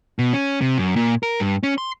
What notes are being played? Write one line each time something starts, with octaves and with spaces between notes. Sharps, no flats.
B2
C#4
C3
F#2
A#2
A#4
G2
C#4
C6